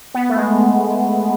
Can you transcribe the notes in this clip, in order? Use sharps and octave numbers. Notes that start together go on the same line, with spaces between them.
B3
A3
G#3